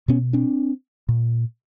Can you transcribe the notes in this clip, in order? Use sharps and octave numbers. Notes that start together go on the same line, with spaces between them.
B2 B3 C#4
C4 D4
A#2